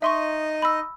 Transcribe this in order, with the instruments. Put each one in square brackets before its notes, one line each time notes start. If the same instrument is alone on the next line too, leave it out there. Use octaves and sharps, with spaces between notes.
[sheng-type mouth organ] D#4 D#5 [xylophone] E5 C6 C#6
[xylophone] B5 E6